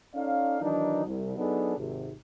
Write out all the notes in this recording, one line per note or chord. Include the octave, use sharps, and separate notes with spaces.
C#4 D#4 A4 D5 F5
D#3 E3 F#3 D4 D#4
C2
F#3 B3 D4 D#4 G#4 A4
G#1 C3